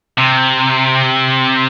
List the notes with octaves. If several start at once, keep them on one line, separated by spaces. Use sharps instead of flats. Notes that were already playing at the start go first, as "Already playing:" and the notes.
C3